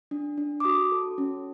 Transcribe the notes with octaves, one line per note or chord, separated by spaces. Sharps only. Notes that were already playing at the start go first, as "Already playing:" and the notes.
D4
D4
D6
F#4 D#6
A4
C#4